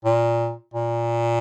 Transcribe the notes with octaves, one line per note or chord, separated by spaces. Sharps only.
A#2
A#2